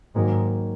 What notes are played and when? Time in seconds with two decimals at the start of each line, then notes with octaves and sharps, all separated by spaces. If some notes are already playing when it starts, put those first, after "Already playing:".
0.15 G#2 D#3 F#3 A#3